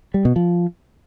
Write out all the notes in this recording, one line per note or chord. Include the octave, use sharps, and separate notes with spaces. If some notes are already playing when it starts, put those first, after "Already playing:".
G3
B2
F3